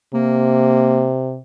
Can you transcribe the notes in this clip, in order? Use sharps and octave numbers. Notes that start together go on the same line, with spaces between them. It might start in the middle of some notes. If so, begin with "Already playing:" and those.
C3 A#3